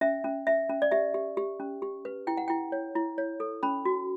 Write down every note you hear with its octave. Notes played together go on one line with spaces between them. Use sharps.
C#4 E5
C#4
C#4 E5
C#4
D5
G4 E5
G4
G4
C#4
G4
B4
E4 G5
F#5
E4 G5
C#5
E4
C#5
A4
C#4 B5
F#4